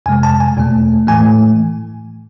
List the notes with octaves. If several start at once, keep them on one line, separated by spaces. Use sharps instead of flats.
F2 C3 G#3 G#5
A5
G#5
E2 B2 A3
A2 E3 A3 G#5